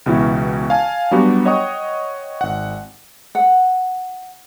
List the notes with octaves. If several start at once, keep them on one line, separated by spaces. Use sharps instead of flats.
C#2 B2 E3 E4 F#4
F5 G#5 A5
F#3 G3 B3 D4 F#4 G4
C#5 D#5 F#5 G5 C#6 D#6
G#1 F#5
F#5